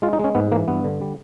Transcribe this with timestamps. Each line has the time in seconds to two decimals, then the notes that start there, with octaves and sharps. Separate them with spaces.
0.02 G#3 F4
0.13 D#4
0.19 G#3 C#4
0.35 G#2 B3
0.52 E3 A#3
0.68 G2 B3
0.84 D3
1.01 G3